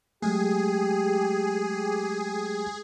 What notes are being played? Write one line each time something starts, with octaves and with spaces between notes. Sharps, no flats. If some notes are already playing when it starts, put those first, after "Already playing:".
F#3 G#3 A3 G4 G#4